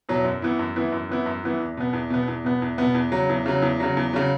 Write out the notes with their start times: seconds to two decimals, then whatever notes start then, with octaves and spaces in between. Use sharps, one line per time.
0.09 E2 B2 F#3
0.24 F#2
0.42 E3 B3 E4
0.59 F#2
0.76 E3 B3 E4
0.92 F#2
1.09 E3 B3 E4
1.26 F#2
1.44 E3 B3 E4
1.60 E2
1.77 B2 B3
1.93 E2
2.10 B2 B3
2.28 E2
2.44 B2 B3
2.62 E2
2.78 B2 B3
2.95 E2
3.12 C#3 F#3
3.29 E2
3.46 C#3 F#3
3.62 E2
3.80 C#3 F#3
3.97 E2
4.13 C#3 F#3